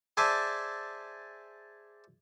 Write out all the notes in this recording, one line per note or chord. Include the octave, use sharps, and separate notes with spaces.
G#4 C5 D5 E5 G#5 A5